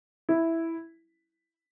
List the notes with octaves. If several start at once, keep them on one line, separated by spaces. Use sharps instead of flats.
E4